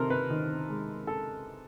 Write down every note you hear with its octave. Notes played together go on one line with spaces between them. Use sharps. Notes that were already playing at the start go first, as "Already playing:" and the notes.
Already playing: C3 D#3 A4 A#4 C5
B4
D#3
G#3
A4